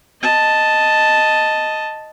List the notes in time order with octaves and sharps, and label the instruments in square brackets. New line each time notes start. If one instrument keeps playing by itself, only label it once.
[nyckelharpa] D#5 A5